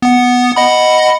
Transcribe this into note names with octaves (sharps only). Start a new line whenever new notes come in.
B3 F#5
D#5 F#5 B5